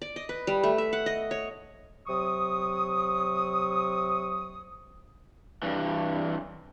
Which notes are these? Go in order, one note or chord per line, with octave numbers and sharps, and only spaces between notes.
D5
D#5
B4
G3
A3
E5
F#5
D#5
C#5
C3 F#3 C#6 D#6
G2 E3